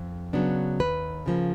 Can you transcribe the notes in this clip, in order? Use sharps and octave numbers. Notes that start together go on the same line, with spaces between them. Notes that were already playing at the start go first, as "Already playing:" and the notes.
Already playing: F2
C#3 F#3 B3 D4
D#2 B4
C#3 F3 A#3